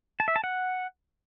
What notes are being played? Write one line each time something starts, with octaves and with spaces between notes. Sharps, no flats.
A5
E5
A5
F#5